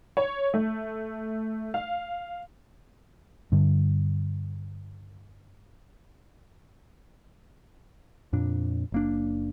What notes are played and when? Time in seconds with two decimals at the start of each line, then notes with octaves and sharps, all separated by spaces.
0.17 C#5
0.54 A3
1.74 F5
3.52 G2 D3
8.33 F2 A#2 D4
8.92 F#1 A#3 D4